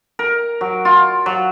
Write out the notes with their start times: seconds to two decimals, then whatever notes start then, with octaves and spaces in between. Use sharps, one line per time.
0.19 A#4
0.61 F#3
0.85 F4
1.26 F#3